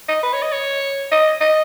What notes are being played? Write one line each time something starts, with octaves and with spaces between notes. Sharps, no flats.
D#5
B4
C#5
D#5
C#5
D#5
D#5